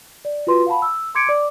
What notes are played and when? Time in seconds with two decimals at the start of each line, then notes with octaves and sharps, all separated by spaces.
0.25 D5
0.47 F4 F#4 B4 C6
0.66 F5 F#5 A5 B5
0.82 E6
1.15 C6 D6 G#6 C#7 D7
1.27 D5 D6